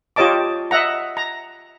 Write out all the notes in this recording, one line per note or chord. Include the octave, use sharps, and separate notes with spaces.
F4 G4 C#5 D#5 A5 D6
D#5 E5 F#5 A#5
A#5